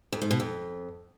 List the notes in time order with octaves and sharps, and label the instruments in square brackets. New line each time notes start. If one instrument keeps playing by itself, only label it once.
[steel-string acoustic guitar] F2
G#2
B2
F2